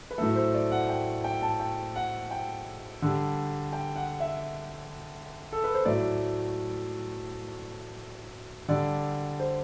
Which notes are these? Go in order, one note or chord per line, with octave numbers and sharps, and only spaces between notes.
B4
A2 F#3 A3 A4
C5
D5
F#5
G5
G5
A5
G5
F#5
G5
D3 G3
G5
F#5
E5
A4
B4
C5
A2 F#3 A3 D5
D3 G3 D5
C5